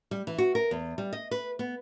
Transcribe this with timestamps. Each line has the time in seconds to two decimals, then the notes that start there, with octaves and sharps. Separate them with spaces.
0.11 G3
0.27 E3
0.38 F#4
0.55 A#4
0.71 E2
0.98 G3
1.13 D#5
1.31 B4
1.59 B3